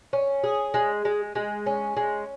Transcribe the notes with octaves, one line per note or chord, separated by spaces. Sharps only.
C#4
G#4
G#3
G#3
G#3
C#4
G#3